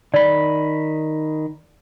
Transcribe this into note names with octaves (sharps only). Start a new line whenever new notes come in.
D#3 D5 B5